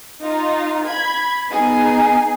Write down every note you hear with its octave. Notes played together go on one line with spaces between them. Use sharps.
D#4 F4
B5 G#6
B3 D#4 G#4